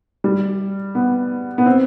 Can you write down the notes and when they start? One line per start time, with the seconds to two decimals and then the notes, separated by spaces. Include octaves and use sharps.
0.24 G3
0.95 B3
1.58 B3
1.66 C4